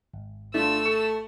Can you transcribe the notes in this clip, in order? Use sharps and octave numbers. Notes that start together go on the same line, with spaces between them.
G#1
A3 D4 F4 E6
A4 C#6 C#7